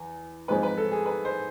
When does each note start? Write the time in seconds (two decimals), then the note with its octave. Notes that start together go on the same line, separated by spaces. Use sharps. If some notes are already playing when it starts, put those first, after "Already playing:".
Already playing: E2
0.48 G#2 F3 G#3 C4 B4
0.63 B4
0.77 A4
0.92 G#4
1.06 B4
1.25 C5